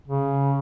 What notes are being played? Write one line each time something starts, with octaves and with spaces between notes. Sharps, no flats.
C#3